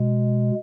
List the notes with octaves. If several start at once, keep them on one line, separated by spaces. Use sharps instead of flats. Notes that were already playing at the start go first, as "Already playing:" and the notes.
Already playing: B2 G#3